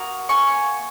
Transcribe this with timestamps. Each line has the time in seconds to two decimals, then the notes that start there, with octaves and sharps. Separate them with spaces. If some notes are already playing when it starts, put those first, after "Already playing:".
Already playing: A#3 F#4 A#5 D#6
0.29 G#5 C#6